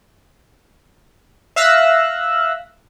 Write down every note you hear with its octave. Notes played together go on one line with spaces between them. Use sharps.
E5 F5 E6 F#6 A#6